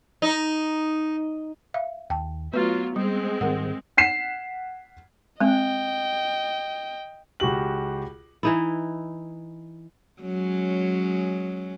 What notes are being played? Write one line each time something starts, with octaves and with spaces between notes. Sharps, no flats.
D#4
E5 F5
D#2 G5 A5
F#3 A3 B3 F4 B4
G3 G#3 C4
G#2 D#3 G3 A#4 F#5
F#5 B6 C7 E7
G#3 C4 D#5 G5
C#2 F#4 G4 F#7
E3 D#4 E4
F#3 G#3 C#4